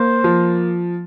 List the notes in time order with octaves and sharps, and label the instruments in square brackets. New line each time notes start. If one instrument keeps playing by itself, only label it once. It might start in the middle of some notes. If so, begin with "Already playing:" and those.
Already playing: [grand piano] A#3 [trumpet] C5
[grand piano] F3